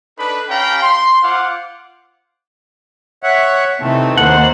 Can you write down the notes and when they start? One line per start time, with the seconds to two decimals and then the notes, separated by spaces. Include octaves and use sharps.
0.17 D4 D#4 A4 B4 B5
0.49 C#4 G4 F5 G5 A#5 B5
0.81 C6
1.22 F4 C5 F5 F#5 D6
3.23 C#5 E5 F#5
3.80 C3 D#3 E3 A3 C4
4.18 D#2 C5 F#5